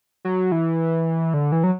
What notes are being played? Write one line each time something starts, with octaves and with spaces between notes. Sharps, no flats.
F#3
E3
D3
E3
F#3